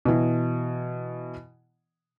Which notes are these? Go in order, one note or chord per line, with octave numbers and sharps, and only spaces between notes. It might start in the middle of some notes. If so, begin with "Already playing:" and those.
B2 E3